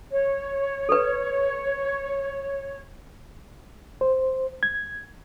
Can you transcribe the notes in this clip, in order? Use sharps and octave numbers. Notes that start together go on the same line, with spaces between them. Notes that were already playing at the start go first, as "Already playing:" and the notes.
C#5
A4 B4
C5
G#6